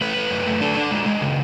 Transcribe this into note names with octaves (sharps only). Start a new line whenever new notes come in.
A3 B4
A3
F#2
A3
D4 A4
D4
G#3
G#3
C#3